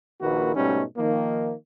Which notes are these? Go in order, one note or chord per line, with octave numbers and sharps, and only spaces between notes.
A#1 D#3 A#3 E4 F#4 B4
G#2 B2 G3 A3 C#4 D#4
D#3 F3 A#3